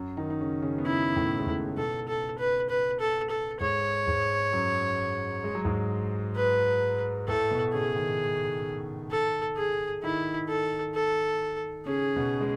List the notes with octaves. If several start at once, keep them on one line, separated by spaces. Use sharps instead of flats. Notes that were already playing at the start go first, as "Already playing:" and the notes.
Already playing: F#2 F#3
D#3 D#4
D#4
C#3 C#4
C#3 C#4
B3
C#3 C#4 E4
A2 A3
G#3
A2 A3
A3
B2 B3 A4
A4
B4
B4
A4
A4
G#2 G#3 C#5
G#2 G#3
F#2 F#3
G#3
F#3
G#2 G#3
B4
A2 A3 A4
B2 B3
C#3 C#4 G#4
D#3 D#4
A4
G#4
D#3 D#4 E4
A4
A4
C#3 C#4 G#4
B2 B3
G#3